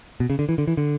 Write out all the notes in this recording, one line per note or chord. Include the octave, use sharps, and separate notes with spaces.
B2
C#3
D3
E3
D3
E3
D3